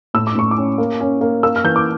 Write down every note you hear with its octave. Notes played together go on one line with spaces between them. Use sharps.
A2 E6
D6
A2 C#6
D6
C#4
A#3
C#4
A#3
A#3 E6
F6
E3 G6
D6